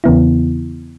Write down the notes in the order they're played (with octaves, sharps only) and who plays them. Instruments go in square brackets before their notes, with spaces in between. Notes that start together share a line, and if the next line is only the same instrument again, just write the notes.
[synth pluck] E2 C#3 E3 B3 E4